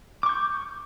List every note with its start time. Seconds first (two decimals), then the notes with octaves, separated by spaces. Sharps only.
0.23 D6
0.26 C#6
0.29 G6